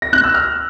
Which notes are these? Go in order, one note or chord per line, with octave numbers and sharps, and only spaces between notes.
A#6
F#6
E6
F6